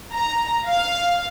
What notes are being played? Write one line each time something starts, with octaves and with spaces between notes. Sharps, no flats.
A#5
F5